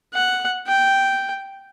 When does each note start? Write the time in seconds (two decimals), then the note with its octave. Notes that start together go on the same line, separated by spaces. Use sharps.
0.14 F#5
0.67 G5